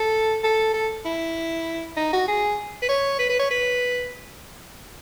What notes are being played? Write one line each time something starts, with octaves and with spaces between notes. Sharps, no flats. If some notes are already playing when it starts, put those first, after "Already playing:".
Already playing: A4
A4
A4
E4
D#4
F#4
G#4
B4
C#5
B4
B4
C#5
B4